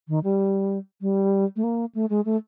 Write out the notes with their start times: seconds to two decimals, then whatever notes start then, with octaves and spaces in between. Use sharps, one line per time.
0.08 D#3
0.24 G3
1.01 G3
1.56 A3
1.63 A#3
1.94 A3
2.10 G#3
2.25 A3